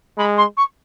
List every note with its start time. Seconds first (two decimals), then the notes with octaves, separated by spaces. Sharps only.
0.17 G#3 B5
0.37 C6
0.56 C#6